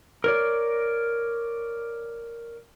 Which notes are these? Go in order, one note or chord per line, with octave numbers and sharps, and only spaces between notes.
A#4 C#5 D5